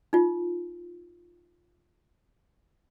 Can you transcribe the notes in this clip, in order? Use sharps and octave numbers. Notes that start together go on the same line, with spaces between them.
D#4 F4